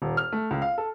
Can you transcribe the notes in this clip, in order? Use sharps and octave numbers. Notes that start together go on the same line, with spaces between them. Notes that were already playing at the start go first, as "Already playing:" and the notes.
D#1
F6
A3
C#2
F5
A4